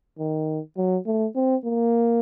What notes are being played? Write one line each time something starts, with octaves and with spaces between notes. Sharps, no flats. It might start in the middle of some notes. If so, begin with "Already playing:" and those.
D#3
F#3
A3
C4
A#3